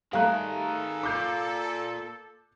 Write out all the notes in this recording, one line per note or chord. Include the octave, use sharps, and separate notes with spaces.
D#3 G3 A3 G#4 F5 A#5 F#6
A4
A#2 D6 G6 C7